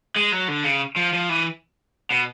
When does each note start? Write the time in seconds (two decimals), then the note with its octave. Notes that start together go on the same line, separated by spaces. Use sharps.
0.16 G#3
0.32 F#3
0.48 D3
0.64 C#3
0.96 F3
1.13 F3
1.29 E3
2.10 B2